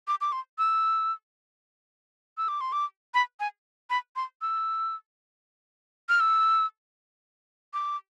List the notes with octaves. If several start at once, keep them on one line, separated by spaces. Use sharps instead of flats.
D6
D6
C6
E6
E6
D6
C6
D6
B5
G#5
B5
C6
E6
F6
E6
D6